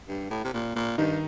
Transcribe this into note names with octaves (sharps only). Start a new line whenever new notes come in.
G2
A2
C3
A#2
A#2
G2 D#3 D#4